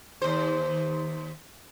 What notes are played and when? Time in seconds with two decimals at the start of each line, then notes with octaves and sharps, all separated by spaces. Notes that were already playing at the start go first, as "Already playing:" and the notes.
0.22 D#2 C5